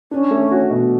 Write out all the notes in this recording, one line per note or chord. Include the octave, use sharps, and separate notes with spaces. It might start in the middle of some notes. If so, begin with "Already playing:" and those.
C#4 D4
A3
F#4
B2